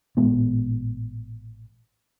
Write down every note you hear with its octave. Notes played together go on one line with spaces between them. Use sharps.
A1 A#2 G#3 B3